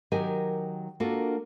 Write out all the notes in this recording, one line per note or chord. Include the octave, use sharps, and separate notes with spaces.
D#3 F#3 G4 A#4 D#5 G#5
A#3 D4 F4 F#4 A4 A#4